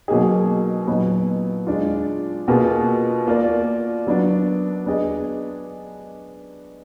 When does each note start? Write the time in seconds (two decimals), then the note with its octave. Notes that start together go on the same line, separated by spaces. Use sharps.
0.08 B2 F#3 A#3 D#4 G#4
0.87 A#2 F#3 B3 D#4
1.67 G#3 D4 F4
2.48 B2 A#3 F4 G#4 B4
3.27 A#3 F4 A#4 D5
4.07 F#3 B3 D4
4.86 B3 D4 G#4 D#5